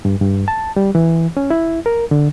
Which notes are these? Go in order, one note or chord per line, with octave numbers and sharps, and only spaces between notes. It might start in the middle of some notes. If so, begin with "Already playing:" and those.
G2
G2
A5
G3
E3
C#4
E4
A#4
D3